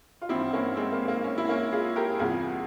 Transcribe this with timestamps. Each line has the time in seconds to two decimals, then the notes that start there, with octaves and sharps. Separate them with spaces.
0.22 F4
0.29 G#1 G2 E3 C4 E4
0.53 A#3 C#4
0.76 G#3 C4
0.93 A#3
1.08 A#3
1.24 C#4
1.38 E4
1.49 A#3 C#4
1.72 F4 G#4
1.96 G4 A#4
2.19 E2 C3 E3 G3 F4 G#4